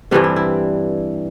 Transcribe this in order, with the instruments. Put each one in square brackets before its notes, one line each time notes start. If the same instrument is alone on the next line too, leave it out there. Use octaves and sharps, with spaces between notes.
[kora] G2 E3 G3 C4 D4
E4
E4